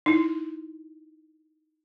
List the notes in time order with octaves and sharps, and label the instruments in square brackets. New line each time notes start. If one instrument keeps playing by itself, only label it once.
[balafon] D#4 E4